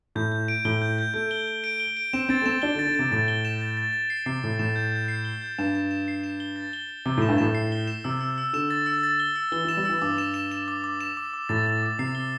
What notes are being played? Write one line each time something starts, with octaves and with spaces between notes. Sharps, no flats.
A2 G6
G6
D7
A2 G7
G6
G6
A3 G6
G7
G7
D7
G7
D7
C4 E7
C4 A6
A3
C4 E7
D4 G7
D3
A6
D3
C3 A6
A2 A6
G7
E7
A6
A6
A6
C7
C3 C7
A2 C7
A2 E7
G6
G6
C7
G7
G6
G2 E7
E7
E7
C7
E7
G7
A6
G7
G7
C3 G7
A2 E7
G2
A2 E7
C7
G7
E7
C3 E6
E6
E6
D3 E7
A6
E6
A6
G7
E6
E3 G7
E3
E7
G3
E3 E6
G2 D6
E7
E7
E7
D6
D6
E7
D6
D6
A2 A6
A6
D6
C3 C7
G7